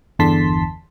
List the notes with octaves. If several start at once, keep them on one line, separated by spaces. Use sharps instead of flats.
G1 E2 D3 A5 C6 B6